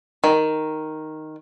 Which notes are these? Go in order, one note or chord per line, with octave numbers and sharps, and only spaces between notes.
D#3